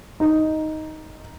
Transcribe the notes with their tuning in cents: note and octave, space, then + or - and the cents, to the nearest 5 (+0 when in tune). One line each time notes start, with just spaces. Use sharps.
D#4 +5